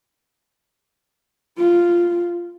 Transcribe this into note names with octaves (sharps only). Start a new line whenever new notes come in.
F4